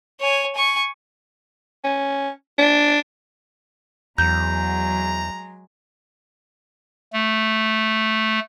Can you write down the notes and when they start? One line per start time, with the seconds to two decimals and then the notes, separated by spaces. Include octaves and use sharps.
0.21 C#5 G#5
0.55 G#5 C#6
1.84 C#4
2.58 D4
4.18 E2 F#3 G#3 A#5 G6
7.13 A3